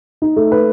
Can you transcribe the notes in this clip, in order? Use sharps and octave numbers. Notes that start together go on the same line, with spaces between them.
D#4
A3
B4